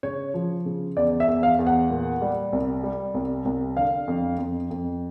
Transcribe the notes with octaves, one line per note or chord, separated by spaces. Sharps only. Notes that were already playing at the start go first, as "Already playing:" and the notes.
C#3 C#5
F3
C#3
E2 D5
E5
E2
F5
E2
F#5
A#2
G3
C2
G3
C2
C2
D3 F5
F2
F2
F2